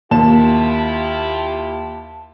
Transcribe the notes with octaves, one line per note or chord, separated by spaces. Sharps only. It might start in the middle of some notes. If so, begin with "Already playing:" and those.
D#2 A#3 E4 F4 G4 A5 E7